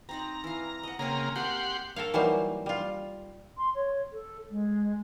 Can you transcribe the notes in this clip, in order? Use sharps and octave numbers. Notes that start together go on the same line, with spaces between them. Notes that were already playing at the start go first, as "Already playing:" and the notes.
C4 D#4 D5 A#5
E3 F5
D#5 F#5
C#3 A#3 C4 A#4 G#5 A#5
A#3 G4 D5 F5 F#5 C6
A4 A#4 C#5 F5
E3 F#3 G3 A#3 D#4 C5
G3 F4
C6
C#5
A4
G#3